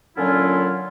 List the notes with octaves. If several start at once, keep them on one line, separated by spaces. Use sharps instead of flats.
A#2 D3 F#3 C#4 E4 F4